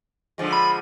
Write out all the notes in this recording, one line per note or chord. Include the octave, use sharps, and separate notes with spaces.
D3 F3 G#3
B5